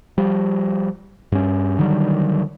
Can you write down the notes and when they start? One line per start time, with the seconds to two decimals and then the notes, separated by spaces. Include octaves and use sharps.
0.18 F3 G3
1.32 G2 C#4
1.79 D3 D#3 F#3 G3